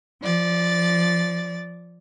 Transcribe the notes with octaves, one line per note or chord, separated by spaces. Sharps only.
F3 D5 A6